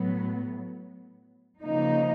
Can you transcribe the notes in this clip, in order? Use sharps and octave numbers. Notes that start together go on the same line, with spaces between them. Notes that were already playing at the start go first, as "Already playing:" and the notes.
Already playing: A2 F#3 B3
C#3 F3 A#3 D#4